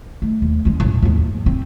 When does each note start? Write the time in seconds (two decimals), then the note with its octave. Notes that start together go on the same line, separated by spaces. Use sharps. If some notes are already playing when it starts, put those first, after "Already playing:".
0.22 A3
0.42 D#2
0.65 G#3 C#4
0.80 F#2 A#2
1.03 D#2 G#2
1.46 C4